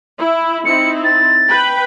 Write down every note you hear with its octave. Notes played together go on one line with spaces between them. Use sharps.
E4
C4 D#4 E4 C#7
A6
B4 G5 B5